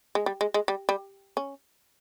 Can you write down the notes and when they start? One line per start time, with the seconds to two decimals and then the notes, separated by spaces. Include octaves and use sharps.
0.15 G#3
0.26 G3
0.41 G#3
0.54 G#3
0.68 G3
0.89 G3
1.37 C#4